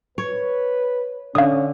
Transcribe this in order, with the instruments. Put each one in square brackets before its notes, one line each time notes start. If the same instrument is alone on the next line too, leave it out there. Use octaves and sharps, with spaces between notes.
[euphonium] B4 [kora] C#5
[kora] D3 [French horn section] C#4 [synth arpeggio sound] F5 D#6